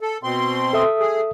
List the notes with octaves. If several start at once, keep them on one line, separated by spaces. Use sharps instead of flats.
A4
B2 C4 C6
A4 E5 D#6
G#4